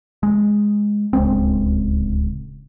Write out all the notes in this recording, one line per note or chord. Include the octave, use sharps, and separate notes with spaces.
G#3
D1 C#2 G#3 C4